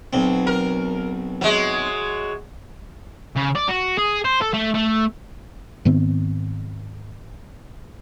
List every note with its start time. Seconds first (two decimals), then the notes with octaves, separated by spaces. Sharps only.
0.13 B1 C4
0.47 A#4
1.41 F#3 G#3
3.36 C#3
3.56 D5
3.69 F#4
3.98 G#4
4.25 C5
4.42 A4
4.54 A3
4.75 A3
5.85 G#2 D#3 B3 C4